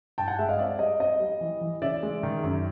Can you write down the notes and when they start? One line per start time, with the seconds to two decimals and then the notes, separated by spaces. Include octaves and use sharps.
0.18 G2 G5 A5
0.28 F#5 G#5
0.39 G#3 E5 F#5
0.49 D#5 F5
0.59 C4 D5 E5
0.79 G3 D#5
1.00 C4 D#5
1.20 G3
1.41 E3
1.61 E3
1.82 C#3 D5 E5
2.03 G#3
2.23 D#3
2.43 F#2